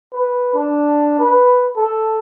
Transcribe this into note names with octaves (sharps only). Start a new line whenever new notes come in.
B4
D4
B4
A4